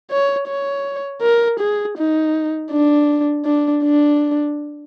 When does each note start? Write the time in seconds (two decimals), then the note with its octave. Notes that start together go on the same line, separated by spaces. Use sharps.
0.11 C#5
0.48 C#5
1.22 A#4
1.60 G#4
1.97 D#4
2.72 D4
3.45 D4
3.84 D4